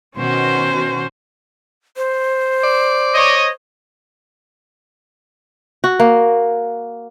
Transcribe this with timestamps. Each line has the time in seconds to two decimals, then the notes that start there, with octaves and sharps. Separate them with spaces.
0.17 B2 D#3 C#4 F#4 C5
1.97 C5
2.63 D5
3.14 C#5 D#5
5.84 F#4
6.00 A#3